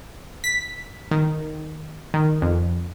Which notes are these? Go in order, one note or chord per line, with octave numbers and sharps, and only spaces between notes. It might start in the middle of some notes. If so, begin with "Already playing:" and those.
B6
D#3
D#3
F2